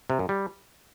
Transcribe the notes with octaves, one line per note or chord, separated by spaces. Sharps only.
C3
F#2
G3